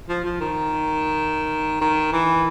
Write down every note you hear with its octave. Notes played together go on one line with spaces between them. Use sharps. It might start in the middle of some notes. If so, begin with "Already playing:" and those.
F3
F3
D#3
D#3
E3